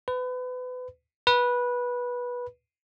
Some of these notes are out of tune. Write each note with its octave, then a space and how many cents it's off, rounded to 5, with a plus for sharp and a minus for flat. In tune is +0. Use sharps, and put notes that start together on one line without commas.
B4 +30
B4 -15